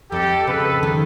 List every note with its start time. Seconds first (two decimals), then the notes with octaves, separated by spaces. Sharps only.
0.11 F2 G4 A4
0.47 C#3 A4 B4
0.83 D#3